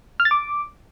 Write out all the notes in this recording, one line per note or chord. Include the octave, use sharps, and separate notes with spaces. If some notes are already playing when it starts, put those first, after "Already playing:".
F6
A6
D6